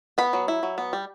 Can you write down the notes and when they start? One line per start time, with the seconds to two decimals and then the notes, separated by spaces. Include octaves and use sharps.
0.18 B3 B5
0.33 F#3
0.48 E4
0.63 F#3
0.78 B3
0.93 G3